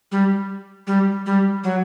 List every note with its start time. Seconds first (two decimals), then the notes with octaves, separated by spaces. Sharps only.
0.12 G3
0.87 G3
1.26 G3
1.64 F#3